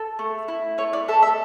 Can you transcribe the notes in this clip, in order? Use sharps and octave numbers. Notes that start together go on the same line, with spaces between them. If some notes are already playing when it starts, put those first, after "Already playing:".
Already playing: A4
A3
E4
A3 C#5
D5
A4 E5
E5